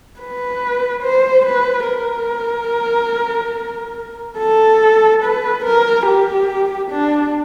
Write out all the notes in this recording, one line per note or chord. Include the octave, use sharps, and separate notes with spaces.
B4
C5
B4
A#4
A4
B4
A#4
G4
D4